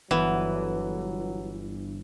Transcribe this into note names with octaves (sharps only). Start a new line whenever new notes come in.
G1 E3 F#3 B3